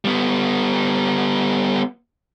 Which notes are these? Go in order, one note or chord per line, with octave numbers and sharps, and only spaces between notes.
G3 B3